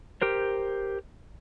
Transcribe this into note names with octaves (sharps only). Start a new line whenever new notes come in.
G4 A#4 C5